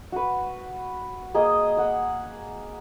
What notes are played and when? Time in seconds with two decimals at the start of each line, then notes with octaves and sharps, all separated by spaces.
0.12 F#4 B4
1.34 A#3 G#4 A#4 D#5
1.77 F#5 E6